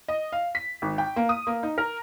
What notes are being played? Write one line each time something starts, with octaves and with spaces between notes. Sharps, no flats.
D#5
F5
B6
G#1
G5
A#3
D#6
A#3
D#4
A#4